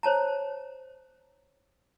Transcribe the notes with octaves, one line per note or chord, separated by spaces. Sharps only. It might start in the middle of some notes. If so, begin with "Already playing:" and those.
C5 C#5 A5 A#5